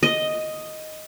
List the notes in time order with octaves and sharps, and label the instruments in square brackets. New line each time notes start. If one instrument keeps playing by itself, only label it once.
[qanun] D#5